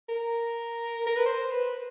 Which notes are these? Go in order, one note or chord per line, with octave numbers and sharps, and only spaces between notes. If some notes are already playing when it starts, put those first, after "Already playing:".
A#4
A#4
B4
C5
B4